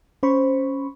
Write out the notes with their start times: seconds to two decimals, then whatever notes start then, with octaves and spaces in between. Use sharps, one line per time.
0.23 C#4 C5 B5 C#6